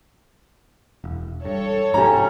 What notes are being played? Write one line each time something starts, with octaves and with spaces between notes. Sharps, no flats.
E1
G2 A4 C#5
G#2 C3 F3 C#4 G4 A#5